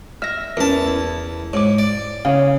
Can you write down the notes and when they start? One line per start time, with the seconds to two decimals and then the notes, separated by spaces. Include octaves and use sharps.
0.22 E5 F6 A#6
0.57 E2 C#4 A#4 A5
0.87 E4
1.53 G#2 C#5 D6
1.78 D5
2.25 C#3 C#5 F5